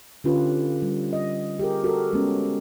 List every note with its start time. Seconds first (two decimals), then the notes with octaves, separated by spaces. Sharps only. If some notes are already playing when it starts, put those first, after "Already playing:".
0.24 D3 C#4 F4 G4 B4
0.82 G3
1.13 D#5
1.59 G4 G#4 A#4
1.84 F#4 A4 A#4
2.13 G#3 B3 C#4